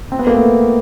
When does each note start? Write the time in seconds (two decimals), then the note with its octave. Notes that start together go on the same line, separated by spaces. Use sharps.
0.12 C4
0.19 B3
0.27 A#3
0.34 A3 B3